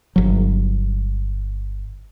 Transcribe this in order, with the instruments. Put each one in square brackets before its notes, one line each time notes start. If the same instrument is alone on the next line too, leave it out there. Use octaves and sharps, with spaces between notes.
[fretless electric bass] G1 F#3